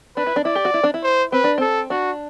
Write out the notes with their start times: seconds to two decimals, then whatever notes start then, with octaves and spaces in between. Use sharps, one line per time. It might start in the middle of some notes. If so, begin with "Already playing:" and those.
0.17 D4 B4
0.27 E4
0.36 D4
0.45 E4 D5
0.55 G4
0.65 F#4
0.74 E4
0.84 D4
0.94 E4
1.03 C5
1.32 C4 B4
1.44 D4
1.58 C4 A4
1.90 D4 F#4